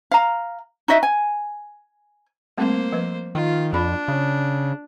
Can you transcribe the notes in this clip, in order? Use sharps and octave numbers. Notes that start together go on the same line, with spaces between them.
F5 A#5
D#4 F#4 D#5 E5
G#5
G3 A3 A#3 C4 C5
F3 B4
D#3 F4
F2 D4 F4 B5
C#3